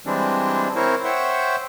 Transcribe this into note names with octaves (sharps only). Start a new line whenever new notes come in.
E3 G3 G#3 C4 D4
C4 E4 A#4 C5 C#5
C5 C#5 E5 F#5 G5